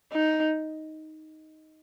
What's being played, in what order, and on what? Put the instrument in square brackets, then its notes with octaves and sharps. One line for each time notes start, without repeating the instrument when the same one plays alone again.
[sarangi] D#4